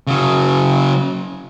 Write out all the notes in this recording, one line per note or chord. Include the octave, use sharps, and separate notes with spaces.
C#3 F#3